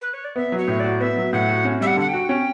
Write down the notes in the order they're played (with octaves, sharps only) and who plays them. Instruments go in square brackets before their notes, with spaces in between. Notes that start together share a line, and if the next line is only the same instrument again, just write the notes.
[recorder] B4
C#5
D5
[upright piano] B3 [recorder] E5
[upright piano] F#3
[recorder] C#5
[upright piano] A2
[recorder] D5
[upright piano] F#4
[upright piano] B3 [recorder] E5
[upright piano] F#3
[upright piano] A2 [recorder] F#5
[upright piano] F#4
C#4
[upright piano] G3 [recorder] E5
[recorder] F#5
[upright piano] D3 [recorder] F#5
[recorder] G5
[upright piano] F#4
C#4